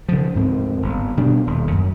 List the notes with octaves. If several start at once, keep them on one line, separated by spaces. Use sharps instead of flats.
C#3 F3
D2 G#2 C4
G1
B2 G3 D4
D#1
F#2